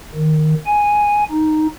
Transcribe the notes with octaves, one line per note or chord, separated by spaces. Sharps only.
D#3
G#5
D#4